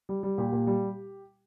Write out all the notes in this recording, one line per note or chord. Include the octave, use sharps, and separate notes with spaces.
G3
G3
A#2 G4
A#2
G3